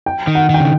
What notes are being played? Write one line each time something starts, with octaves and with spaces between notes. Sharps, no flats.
G5
D#3
F#5
D#3 G5
C#3